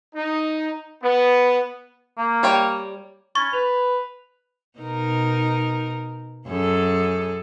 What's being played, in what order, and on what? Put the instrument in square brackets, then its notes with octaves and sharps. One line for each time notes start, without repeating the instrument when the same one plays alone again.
[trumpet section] D#4
B3
[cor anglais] A#3
[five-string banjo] G3 C#5 G5
[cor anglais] C#4 [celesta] B5 G#6 A6 [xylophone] C#6
[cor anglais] B4 [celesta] F7
[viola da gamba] B2 D#4 A#4
F#2 G#4 A4